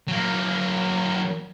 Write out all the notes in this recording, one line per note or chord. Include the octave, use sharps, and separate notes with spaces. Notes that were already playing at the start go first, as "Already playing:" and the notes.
F#3 A#3